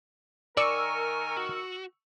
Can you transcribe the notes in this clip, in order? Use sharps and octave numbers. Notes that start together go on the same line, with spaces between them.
D#3 A#4 D5 G#5 C#6 E6 C#7
F#4